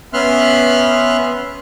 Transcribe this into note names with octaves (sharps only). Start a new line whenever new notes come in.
B3 C#4 E5 C6 F6 F#6